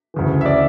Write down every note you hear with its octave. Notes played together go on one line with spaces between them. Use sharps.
D2 C#3 E3
E5
D5